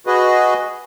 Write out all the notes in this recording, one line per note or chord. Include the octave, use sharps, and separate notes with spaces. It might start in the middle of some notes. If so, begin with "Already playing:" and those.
F#4 G#4 B4 D#5